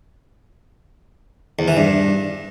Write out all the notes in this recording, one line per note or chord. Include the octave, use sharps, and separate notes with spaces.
E2
E3
G2